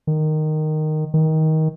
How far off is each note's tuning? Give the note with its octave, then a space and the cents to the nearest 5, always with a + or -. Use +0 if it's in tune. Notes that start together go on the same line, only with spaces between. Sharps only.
D#3 -10
D#3 +20